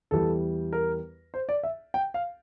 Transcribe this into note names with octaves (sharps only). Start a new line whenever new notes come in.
E2 E3 G3 A4
A#4
C5
D5
E5
G5
F5